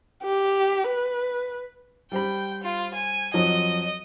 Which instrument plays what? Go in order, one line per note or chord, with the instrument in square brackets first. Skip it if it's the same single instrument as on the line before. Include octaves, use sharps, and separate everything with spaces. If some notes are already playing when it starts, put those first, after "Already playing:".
[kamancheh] G4
B4
[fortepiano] G3 C5 B5 [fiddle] G5
[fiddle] F4
G#5
[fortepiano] F2 F3 F#3 [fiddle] D#5